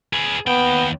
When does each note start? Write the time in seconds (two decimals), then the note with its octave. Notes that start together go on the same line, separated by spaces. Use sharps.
0.13 G#4 B4
0.47 D#2 B3 G5